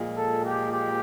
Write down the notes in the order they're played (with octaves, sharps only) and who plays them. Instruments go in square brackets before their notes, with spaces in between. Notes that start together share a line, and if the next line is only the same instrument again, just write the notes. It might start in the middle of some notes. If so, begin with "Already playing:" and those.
Already playing: [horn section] A#2 F3 G#3
A4
G4
G4